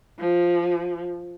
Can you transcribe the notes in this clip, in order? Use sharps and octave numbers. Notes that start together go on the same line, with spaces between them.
F3